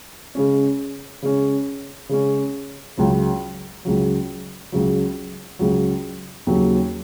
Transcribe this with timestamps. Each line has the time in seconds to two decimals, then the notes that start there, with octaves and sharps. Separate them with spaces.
0.35 C#3 G#3 C#4
1.22 C#3 G#3 C#4
2.09 C#3 G#3 C#4
2.97 C#2 C#3 F#3
3.85 C#2 C#3 F#3
4.72 C#2 C#3 F#3
5.59 C#2 C#3 F#3
6.47 D#2 C#3 F#3